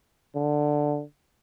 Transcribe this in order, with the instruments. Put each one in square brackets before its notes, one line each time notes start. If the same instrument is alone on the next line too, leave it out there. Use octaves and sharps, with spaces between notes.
[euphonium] D3